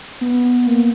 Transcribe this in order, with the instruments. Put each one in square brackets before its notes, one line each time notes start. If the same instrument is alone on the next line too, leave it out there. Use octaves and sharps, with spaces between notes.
[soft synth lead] B3
A#3